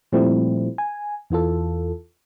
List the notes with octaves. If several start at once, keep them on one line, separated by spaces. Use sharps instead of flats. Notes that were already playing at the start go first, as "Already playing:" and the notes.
A#2 F3 G3 A3 C4 E4
G#5
E2 E3 F4 A4